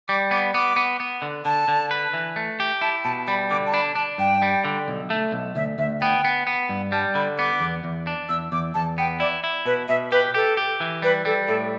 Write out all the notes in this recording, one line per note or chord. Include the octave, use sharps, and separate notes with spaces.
G3 D6
B3 D6
B3 D6
B3
B3
D3
D3 A5
D3
B4
E3
A3
G4
E4 A5
B2 A5
G3 B5
D3 D6
A5
D4 B5
D4 A5
G2 G5
G3
D3
B1
A3
B1
D2 E5
D2 E5
B3 G5
B3
B3
G2
G3 A5
D3 B5
B3 D6
E2
E2
D4
E2 E6
E2 D6
E2 A5
B3 G5
E4 D5
E4
B2 B4
B2 E5
G4 B4
G4 A4
G4
E3
G3 B4
G3 A4
A2 A4